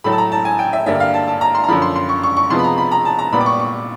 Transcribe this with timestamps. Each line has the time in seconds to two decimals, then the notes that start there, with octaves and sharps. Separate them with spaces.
0.04 A2 F#3 A3 B5
0.12 A5
0.18 A#5
0.32 A5
0.45 G#5
0.59 G5
0.73 E5
0.86 G2 D3 G3 A#3 E5
1.00 F5
1.14 A5
1.28 A5
1.41 A#5
1.55 C6
1.64 A#5
1.68 F#2 D3 F3 B5
1.82 C6
1.96 C6
2.09 C#6
2.23 C#6
2.37 C#6
2.50 C3 F3 G#3 B3 C6
2.59 B5
2.64 A#5
2.78 B5
2.91 A#5
3.05 A5
3.19 A#5
3.32 A#2 G3 B3 B5
3.41 D6
3.46 C#6
3.60 C#6